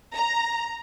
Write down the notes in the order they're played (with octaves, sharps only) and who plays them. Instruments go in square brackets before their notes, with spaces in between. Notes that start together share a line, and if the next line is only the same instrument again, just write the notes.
[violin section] A#5